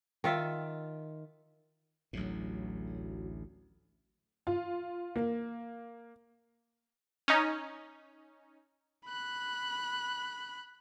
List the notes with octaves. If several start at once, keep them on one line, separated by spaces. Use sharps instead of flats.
D#3 F4 E5
A1 D2 A2 F#3
F4
A#3
C#4 D#4
B5 F#6